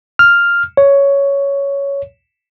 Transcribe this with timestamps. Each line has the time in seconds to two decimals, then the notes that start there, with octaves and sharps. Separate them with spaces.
0.19 F6
0.77 C#5